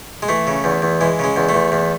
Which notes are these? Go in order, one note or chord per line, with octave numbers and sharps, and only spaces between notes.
G#3
E3 A3
C#3
E2
E2
E3 G#3
C#3 G#3
E2
A3
E2
E2